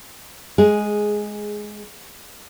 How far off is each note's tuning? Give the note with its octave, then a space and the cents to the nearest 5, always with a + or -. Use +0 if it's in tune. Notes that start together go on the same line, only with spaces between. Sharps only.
G#3 +10 G#4 +0